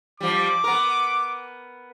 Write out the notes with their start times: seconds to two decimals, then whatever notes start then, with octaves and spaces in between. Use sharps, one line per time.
0.21 F3 G3 D6
0.64 B3 A#4